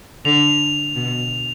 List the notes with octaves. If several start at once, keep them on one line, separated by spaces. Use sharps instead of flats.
D3 F7
B2